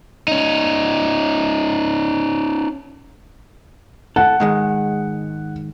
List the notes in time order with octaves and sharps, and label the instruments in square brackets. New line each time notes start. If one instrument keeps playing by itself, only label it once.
[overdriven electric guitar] C#4 D#4
[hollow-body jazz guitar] A4 [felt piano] F#5
[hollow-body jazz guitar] G#2 D#3 G#3